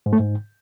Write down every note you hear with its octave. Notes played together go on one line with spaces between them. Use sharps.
G#2
A3
G#2